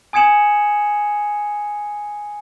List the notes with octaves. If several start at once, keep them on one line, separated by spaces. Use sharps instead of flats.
G#5 D#6 G#6 C#7 E7 F#7